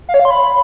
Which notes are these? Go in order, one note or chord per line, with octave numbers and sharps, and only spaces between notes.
F5
C#5
F5
C6
B5